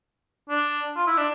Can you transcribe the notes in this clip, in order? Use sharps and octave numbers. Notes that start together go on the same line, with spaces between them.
D4
F4
E4
D4